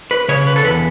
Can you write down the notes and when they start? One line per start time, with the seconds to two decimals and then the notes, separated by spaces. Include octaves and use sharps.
0.11 B4
0.29 C#3 C#5
0.47 B4
0.56 A4
0.64 E2 B4